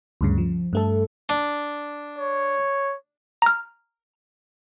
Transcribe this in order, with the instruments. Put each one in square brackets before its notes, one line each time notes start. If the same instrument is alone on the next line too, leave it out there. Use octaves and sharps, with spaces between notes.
[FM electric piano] D2 G2 C#3
F3
G2 A3 A4
[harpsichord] D4
[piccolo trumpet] C#5
[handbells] A#5 F6